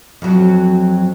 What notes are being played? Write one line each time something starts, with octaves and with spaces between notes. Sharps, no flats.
F2 F#3